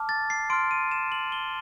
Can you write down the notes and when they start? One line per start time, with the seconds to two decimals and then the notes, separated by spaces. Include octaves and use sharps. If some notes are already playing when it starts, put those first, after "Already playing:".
Already playing: A5 D6 F6
0.09 A6
0.30 C7
0.50 C6 F6 D7
0.71 D#7
0.91 E7
1.12 F#7
1.32 G7